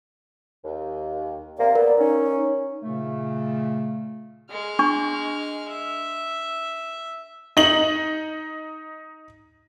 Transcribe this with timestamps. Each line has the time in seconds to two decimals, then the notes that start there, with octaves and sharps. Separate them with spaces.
0.64 D#2
1.58 C3 A#3 D5
1.75 B3 A#4
1.99 C#4 D#4
2.83 A#2 C#3 A3
4.50 G#3 F6
4.79 D4 C#6
5.69 E5
7.57 D#4 F#7